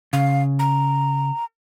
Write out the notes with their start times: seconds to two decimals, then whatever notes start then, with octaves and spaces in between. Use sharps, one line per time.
0.13 C#3 F5
0.59 A#5